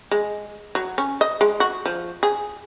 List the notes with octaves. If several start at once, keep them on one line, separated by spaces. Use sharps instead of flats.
G#3
F#3
C#4
D#5
G#3
F#4
F3
G#4